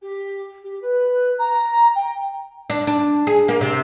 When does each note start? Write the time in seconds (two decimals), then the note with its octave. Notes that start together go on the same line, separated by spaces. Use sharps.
0.01 G4
0.64 G4
0.82 B4
1.38 A#5
1.95 G5
2.70 D4
2.87 D4
3.27 G#4
3.48 A#3
3.61 C3